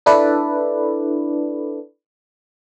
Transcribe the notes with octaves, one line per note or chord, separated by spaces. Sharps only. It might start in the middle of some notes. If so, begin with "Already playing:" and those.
D4 E4 A4 B4 D5